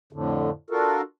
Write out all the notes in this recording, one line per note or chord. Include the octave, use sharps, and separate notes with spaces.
F2 A2 D3
D4 F4 F#4 A4 A#4